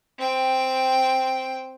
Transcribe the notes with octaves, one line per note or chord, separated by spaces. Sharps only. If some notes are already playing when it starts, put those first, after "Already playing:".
C4 G5